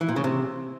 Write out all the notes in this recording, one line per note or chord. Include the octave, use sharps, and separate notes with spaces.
E3
A#2
C#3
C3